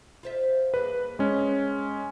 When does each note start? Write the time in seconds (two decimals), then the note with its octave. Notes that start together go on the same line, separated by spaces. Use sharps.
0.23 F4 C5 E5
0.74 G2 A#3 G#4 B4
1.19 G#3 C#4